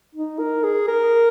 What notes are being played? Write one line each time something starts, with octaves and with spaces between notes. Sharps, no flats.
D#4
A#4
G#4
A#4